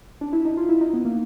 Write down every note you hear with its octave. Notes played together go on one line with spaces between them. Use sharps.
D4
E4
D#4
F4
E4
D#4
B3
A#3